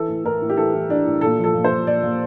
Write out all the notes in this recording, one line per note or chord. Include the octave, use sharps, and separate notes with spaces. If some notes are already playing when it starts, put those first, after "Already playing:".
Already playing: E3 A4
A2
A2 A#4
A2
G4
E3 A4
E3
A2 D4
A2
A#2 A4
F3
A4
A#2
C5
A#2
A#2 D5
A#2